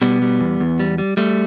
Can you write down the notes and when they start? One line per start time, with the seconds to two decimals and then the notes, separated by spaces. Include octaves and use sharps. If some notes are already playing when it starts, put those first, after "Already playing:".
0.01 B2 G3 B3
0.22 G3
0.40 E2
0.60 E2
0.80 G3
0.98 G3
1.17 G3 A3